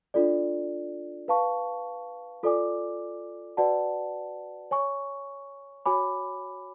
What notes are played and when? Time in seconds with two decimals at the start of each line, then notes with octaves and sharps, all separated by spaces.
0.14 D4 F4 A4 D5
1.28 B4 F5 A5 C#6
2.43 F4 A4 D5 G#5 D6
3.57 F#4 B4 D5 F#5 A5
4.71 C#5 G#5 C#6
5.86 F#4 C#5 G#5 B5 D6